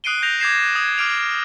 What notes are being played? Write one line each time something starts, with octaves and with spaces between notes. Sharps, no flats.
D#6 F#6 C7 D7 D#7 G7
G6 A#6 F7
D6 G6 G#6 A#6 C7 E7
D#6 G#6
D6 F6 D7 F7